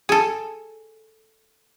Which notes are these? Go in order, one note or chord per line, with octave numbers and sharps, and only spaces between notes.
G#4 A4